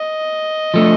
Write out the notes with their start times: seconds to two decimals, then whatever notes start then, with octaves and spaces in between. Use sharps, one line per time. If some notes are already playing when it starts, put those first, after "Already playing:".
Already playing: D#5
0.74 F3 A3 D4